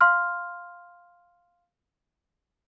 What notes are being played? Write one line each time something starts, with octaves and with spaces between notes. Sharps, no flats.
F5 C6 F6